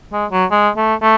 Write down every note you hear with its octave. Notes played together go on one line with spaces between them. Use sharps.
G#3
F#3
G#3
A3
A3